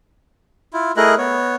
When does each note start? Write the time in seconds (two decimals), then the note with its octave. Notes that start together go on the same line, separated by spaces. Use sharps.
0.73 E4 F4
0.97 A3 E4 G#4 A#4 D#5 F#6
1.18 B3 C#5